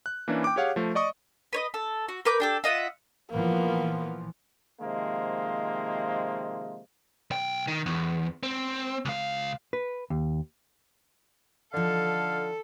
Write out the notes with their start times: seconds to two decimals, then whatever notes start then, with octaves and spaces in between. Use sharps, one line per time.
0.06 F#6
0.28 E3 A#3 C#4 D4 E4
0.44 G5 D6
0.56 G4 G#4 C#5 F5 F#5
0.76 F3 A3
0.95 D5 D#5 C#6 D#6
1.53 B4 C#5 D#5
1.74 A4
2.08 F#4
2.25 A#4 B4 D6 G6
2.40 D4 G4 A4
2.64 F4 D#5 E5 F#5
3.31 A#2 E3 F3 A#3 B3
4.81 C3 D#3 F3 G#3 A#3
7.31 B1 G5
7.68 D#3
7.86 E2
8.43 C4
9.05 C#2 F5
9.73 B4
10.10 D#2
11.74 D3 F3 D#4 A4 F5